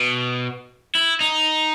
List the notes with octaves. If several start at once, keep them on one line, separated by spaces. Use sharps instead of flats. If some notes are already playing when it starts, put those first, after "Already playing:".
Already playing: B2
E4
D#4